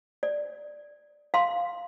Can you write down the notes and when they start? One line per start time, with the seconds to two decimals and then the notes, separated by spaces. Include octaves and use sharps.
0.23 D5
1.34 F5 C6